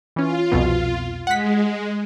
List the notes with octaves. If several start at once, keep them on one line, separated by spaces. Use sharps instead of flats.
E3 C#4 F4
C2 F2 B2
G#3 F#5 B6